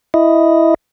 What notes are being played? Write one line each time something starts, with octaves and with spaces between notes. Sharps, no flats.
E4 D#5